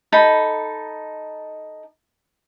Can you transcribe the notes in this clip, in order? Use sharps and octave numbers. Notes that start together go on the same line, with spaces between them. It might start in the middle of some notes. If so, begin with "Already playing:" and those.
D#4 A4 B5